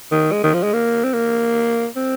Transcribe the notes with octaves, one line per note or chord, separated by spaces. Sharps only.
D#3
G#3
D#3
F3
G#3
A#3
C4
A#3
C4